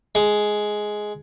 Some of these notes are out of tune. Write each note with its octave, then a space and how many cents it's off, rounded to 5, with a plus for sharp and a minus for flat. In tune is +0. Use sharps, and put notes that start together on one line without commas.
G#3 +10